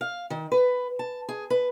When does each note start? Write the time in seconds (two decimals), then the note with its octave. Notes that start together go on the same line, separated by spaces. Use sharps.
0.01 F5
0.30 D#3
0.52 B4
0.99 A5
1.29 G#4
1.50 B4